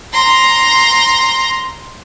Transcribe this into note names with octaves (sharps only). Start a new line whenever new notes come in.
A#5 C6